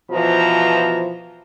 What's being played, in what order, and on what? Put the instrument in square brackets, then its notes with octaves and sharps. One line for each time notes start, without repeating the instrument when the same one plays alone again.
[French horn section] B2 E3 F3 [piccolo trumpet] A#5